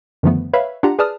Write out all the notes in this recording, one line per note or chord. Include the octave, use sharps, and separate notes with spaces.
F#2 D3 D#3 F3 A3 B3
B4 C#5 E5 F5 B5
D4 F4 G4 F#5 A#5
G#4 B4 D5 A5 D#6 F6